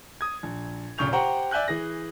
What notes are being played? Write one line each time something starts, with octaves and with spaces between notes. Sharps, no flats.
D#6 G#6
A#1
F1 A#1 C#3 C#6 G6 F7
G4 C5 F#5 G5 A#5 C#6
D5 E5 G#5 F#6 G6
E3 G#4 A#6